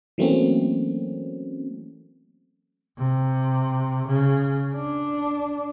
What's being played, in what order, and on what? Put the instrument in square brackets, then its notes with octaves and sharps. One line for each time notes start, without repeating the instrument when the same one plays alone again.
[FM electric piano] E3 F#3 A3 A#3 C4 C#4
[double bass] C3
C#3
D4